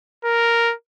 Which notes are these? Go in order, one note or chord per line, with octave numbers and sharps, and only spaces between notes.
A#4